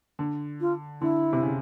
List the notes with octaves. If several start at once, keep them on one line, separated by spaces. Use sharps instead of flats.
D3
F4
D3 E4
C3
C#3